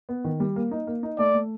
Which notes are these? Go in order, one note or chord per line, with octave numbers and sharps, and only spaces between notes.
B3
D#3
G3
A#3
D#4
A#3
D#4
A3 D5
A3